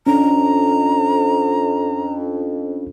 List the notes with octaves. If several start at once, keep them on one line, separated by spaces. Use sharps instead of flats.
F2 C#4 D4 A#5